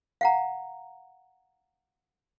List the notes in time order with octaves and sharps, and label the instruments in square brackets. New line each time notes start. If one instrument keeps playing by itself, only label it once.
[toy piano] F5 F#5 A#5